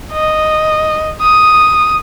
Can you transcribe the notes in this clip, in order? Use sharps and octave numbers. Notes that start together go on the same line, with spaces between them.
D#5
D#6